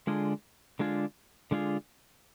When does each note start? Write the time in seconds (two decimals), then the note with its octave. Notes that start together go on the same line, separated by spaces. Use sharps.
0.07 D3 G#3 D4 F4 G#4
0.79 D3 G#3 D4 F4 G#4
1.51 D3 G#3 D4 F4 G#4